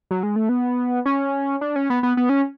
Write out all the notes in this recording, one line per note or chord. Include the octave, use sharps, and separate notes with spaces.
F#3
G#3
A3
B3
C#4
D4
C#4
B3
B3
B3
C#4